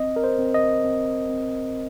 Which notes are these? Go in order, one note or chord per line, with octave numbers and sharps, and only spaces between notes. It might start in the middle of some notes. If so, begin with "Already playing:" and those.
Already playing: C4 D#5
A#4
C5
C4
D#5
C4
C4